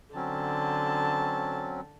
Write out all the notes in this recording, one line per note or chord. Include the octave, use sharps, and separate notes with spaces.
D3 F#3 C4 C#4 A5